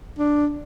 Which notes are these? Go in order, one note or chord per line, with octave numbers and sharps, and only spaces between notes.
D4